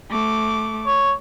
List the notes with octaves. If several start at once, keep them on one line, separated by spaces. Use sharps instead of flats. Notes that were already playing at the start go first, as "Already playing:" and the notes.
A3 D6
C#5